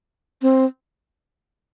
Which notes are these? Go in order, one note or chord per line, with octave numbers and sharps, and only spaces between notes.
C4